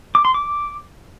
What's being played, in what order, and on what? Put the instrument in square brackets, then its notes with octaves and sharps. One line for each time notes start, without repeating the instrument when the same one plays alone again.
[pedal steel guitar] D6
C6
D6